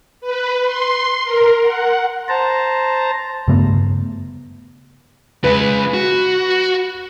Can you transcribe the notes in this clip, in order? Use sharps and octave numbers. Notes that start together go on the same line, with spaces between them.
B4
C6
A#4
F#5
C5 A5 A#5
G2 C#3 A3 B3
C#3 G#3 B4
F#4